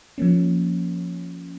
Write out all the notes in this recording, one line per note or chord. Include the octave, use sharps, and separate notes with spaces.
F3 A#3 C#4